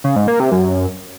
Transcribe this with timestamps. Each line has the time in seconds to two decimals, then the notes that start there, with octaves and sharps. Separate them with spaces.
0.04 C#3
0.16 G#2
0.28 A#3
0.40 C3
0.52 F#2